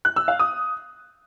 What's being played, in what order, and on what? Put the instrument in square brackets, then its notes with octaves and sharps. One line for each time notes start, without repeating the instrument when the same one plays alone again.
[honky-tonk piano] F#6
E6
F5
D#6